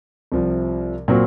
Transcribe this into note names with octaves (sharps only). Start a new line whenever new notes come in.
C2 C3 F3
A#2 F#3 C4 F#4 A#4